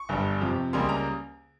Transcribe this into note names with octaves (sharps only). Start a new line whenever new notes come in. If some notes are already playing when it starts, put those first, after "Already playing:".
Already playing: C#6
G1 G2 G3
F2 C3 F3
C#2 C#3 G3 A#3 C6
A#5